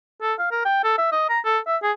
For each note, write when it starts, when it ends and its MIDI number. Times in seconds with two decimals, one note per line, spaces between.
0.22 0.34 69
0.39 0.49 77
0.51 0.63 70
0.65 0.84 79
0.84 0.94 69
0.98 1.10 76
1.12 1.26 75
1.29 1.39 82
1.45 1.58 69
1.67 1.77 76
1.83 1.92 68